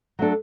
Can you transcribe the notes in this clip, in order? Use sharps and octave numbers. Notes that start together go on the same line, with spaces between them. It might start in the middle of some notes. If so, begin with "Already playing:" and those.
F#3 A3 D4 A4